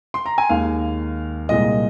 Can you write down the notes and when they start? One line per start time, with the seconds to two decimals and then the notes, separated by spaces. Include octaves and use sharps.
0.14 C6
0.26 A#5
0.38 G#5
0.50 D#2 D#3 G#3 F5
1.49 C2 A#2 G#3 D#5